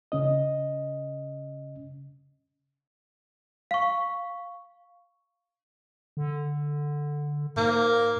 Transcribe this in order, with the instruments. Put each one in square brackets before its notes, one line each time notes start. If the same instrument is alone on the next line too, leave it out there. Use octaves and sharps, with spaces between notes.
[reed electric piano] C#3 C#4 D#5
[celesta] F5 C#6
[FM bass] D3
[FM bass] G#2 [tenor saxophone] A#3